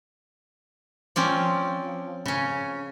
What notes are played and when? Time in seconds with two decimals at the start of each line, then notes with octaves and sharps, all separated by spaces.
1.16 F3 C4 C#4 D5
2.26 C#3 C#4